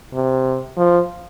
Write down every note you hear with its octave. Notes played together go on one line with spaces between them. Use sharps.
C3
F3